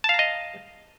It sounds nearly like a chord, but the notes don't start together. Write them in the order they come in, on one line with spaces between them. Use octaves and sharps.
A5 F5 A#5 D#5